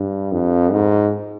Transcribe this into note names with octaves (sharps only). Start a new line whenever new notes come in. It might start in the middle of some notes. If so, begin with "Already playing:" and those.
Already playing: G2
F2
G#2